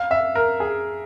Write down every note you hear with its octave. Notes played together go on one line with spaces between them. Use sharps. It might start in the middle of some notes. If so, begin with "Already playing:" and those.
Already playing: F5
E5
A#4
G#4